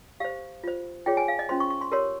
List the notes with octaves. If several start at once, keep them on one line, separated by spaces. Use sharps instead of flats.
G4 C5 F5
F4 C5
F4 G#4 C#5 G5
G#5
F5
D#5
C#4 F4 C5 C6
C#6
C#6
C6
G4 A#4 C#5 C6